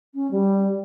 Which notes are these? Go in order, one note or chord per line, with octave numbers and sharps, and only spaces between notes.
C#4
G3